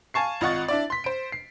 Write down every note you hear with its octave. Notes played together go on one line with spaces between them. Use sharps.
F5 G#5 A5 C#6 C7
G#1 F4 D#5 F#5 C#6 A6
D4 E4 D5
C6 B6
C5 D7
C7